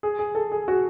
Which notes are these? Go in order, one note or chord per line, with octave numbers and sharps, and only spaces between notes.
G#4
G#4
A4
G#4
F#4